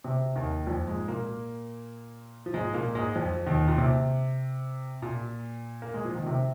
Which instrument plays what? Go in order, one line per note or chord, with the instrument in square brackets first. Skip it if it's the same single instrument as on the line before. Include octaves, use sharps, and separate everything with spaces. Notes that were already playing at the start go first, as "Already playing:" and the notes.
[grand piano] C3
D#2 D#3
F2 F3
G#2 G#3
A#2 A#3
F3
G#2 G#3
A#2 A#3
G#2 G#3
F2 F3
D#2 D#3
A#2
C3
A#2
A#3
G#3
F3
D#3
C3